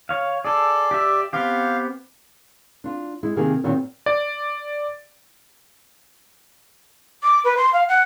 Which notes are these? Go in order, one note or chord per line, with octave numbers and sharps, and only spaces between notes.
C#5 F5
G#4 A4 D5
G4 E5
B3 C4 G4 F5
D4 F4
G#3 E4
C3 D#3 A#3 G#4 A#4 G#5
A#2 D3 D#3 F#3 B3 C4
D5
D6
B4
C6
F5
F#5